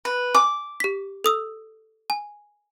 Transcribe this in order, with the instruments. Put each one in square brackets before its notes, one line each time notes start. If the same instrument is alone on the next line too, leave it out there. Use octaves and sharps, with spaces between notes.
[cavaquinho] B4
[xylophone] G#5 [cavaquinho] D6
[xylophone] G4 B6
A4 D#6 E6
G#5